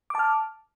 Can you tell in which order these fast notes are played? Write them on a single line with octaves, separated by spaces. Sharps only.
D6 A5 F6